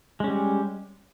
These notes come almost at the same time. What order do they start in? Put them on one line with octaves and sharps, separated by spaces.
G#3 C#4 G3